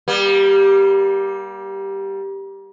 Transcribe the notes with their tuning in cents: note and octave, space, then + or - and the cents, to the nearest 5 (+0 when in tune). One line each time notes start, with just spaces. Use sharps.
G3 +0 A#3 +40